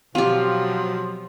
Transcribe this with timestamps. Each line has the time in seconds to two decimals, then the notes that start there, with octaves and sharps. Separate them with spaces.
0.15 B2 F3 F#3 C4 F4 G4